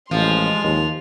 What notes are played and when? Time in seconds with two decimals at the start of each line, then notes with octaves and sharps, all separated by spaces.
0.11 A1 F3 G#3 C6 F7
0.63 D#2